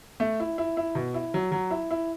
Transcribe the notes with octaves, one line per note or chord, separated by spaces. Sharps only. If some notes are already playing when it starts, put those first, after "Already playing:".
A3
E4
E4
E4
B2
E4
F#3
F#3
E4
E4